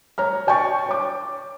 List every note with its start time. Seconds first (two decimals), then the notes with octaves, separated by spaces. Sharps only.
0.18 C#5 A#5 F6
0.47 D5 G5 G#5 C#6 A6
0.89 C#5 D6